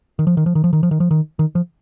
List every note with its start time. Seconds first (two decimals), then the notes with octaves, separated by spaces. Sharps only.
0.19 D#3
0.27 F3
0.37 D#3
0.46 F3
0.55 D#3
0.64 F3
0.73 D#3
0.83 F3
0.91 D#3
1.00 F3
1.11 D#3
1.39 D#3
1.55 F3